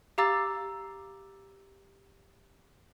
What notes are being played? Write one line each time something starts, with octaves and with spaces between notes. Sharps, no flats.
G4 F5 A#5 D6 E6 A6